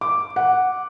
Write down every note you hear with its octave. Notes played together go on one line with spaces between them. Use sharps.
D6
F#5